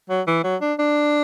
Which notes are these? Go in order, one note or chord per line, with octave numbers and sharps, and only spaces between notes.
F#3
E3
F#3
D4
D4